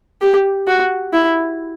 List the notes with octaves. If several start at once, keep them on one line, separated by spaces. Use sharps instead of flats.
G4
F#4
E4